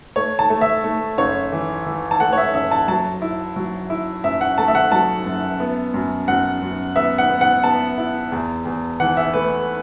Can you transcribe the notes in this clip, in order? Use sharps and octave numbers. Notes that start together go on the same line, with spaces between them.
A3 C#5
A5
A3
E5
A3
F#1 C#5
E3
E3
A5
A3 F#5
C#5
E5
F#1 E5
A5
F#3 A5
E4
F#3
E4
F#2 E5
F#5
A3 A5
E5
F#5
F#3 A5
F#2
B3
F#2
F#2 F#5
F#2
B3 E5
F#5
B3
F#5
B3 A5
E4
E2
E2
E3 F#5
E5
A3 B4